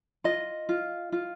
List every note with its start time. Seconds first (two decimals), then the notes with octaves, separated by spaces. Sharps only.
0.24 F4 D#5
0.69 F4
1.12 F4